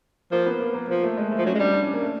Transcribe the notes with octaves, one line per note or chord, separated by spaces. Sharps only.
F3 A#3
B3
A#3
A#3
F3 A#3
A3
G#3
A3
F3
F#3 C#4
G#3
G3 D4
D4
C#4
A#3
A3